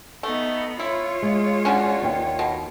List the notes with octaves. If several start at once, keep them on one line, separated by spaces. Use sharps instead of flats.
A3 B3 D#4
E4 F4 C#5
G#3
C#4 D4 F#4
D#2 G5
B2